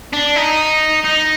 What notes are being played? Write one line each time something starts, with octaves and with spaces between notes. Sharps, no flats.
D4
D#4
D#4